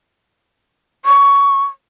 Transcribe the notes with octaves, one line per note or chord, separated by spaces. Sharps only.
C#6